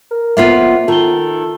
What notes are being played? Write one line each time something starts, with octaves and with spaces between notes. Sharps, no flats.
A#4
F2 A#3 B3 F4 E5 C7
D#3 F4 A4 G7